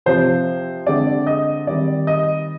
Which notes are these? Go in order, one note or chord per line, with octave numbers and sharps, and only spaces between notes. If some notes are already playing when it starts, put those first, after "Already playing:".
C3 F3 C4 C5
D3 G#3 C4 D5
D#5
D#3 G3 C4 D5
D#5